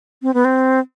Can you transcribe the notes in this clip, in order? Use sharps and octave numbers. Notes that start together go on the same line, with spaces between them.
C4
B3
C4